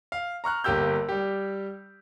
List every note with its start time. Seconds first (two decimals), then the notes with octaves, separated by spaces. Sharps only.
0.12 F5
0.44 A#5 C#6 F6 F#6
0.64 G1 A#3 G4 E6 G6
1.09 G3 G4